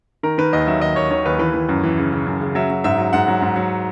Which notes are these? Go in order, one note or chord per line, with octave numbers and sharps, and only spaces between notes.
D#3 A#4
D#3 B4
D#2 D#5
F#3 E5
D#2 D#5
D#2 C#5
D#3 C#5
D#2 B4
E3 B4
E3
F#2
E3
C#3
C#3
F#2
C#3
F#3 E5
F#3
G#2 E5
F#3
G#2 F#5
F#3
G#2
F#3